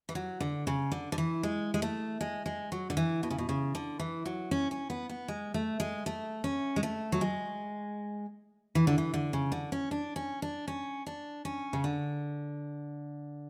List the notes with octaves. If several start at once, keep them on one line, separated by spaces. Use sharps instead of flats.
E3
F#3
D3
C#3
D3
D3
E3
G#3
G#3
A3
G#3
G#3
F#3
D3
E3
B2
C#3
B2
C#3
D3
E3
F#3
C#4
C#4
B3
B3
G#3
A3
G#3
A3
C#4
G#3
A3
F#3
G#3
E3
D3
E3
D3
C#3
D3
C#4
D4
C#4
D4
C#4
D4
C#4
C#3
D3